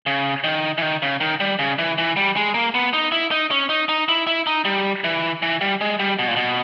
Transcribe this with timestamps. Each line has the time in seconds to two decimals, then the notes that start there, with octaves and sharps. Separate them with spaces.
0.06 C#3
0.44 D#3
0.78 E3
0.82 D#3
1.02 C#3
1.20 D#3
1.40 G3
1.59 C#3
1.79 E3
1.98 E3
2.17 G3
2.36 G#3
2.54 A#3
2.75 B3
2.93 D#4
3.12 E4
3.31 D#4
3.51 C#4
3.69 D#4
3.89 D#4
4.09 E4
4.27 E4
4.47 D#4
4.65 G3
5.04 E3
5.42 E3
5.61 G3
5.81 G#3
5.99 G3
6.19 B2
6.28 A#2
6.36 B2